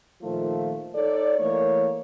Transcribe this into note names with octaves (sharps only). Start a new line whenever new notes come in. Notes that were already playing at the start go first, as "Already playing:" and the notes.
A#2 D#3 F3 A3 F4
D#4 A4 C#5 D5
E3 A3 A#3 C#5